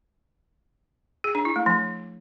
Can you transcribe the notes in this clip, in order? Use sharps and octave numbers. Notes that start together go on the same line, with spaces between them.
G#4
D4
E4
A3
F3